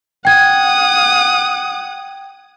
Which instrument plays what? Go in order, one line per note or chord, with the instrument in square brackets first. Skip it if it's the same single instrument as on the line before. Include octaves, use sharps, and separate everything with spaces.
[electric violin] F#5 D#6 [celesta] G5 G#6